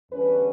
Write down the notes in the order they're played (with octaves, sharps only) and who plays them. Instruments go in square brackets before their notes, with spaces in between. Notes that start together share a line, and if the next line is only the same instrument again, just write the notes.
[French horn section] E2 D3 G3 C#4 B4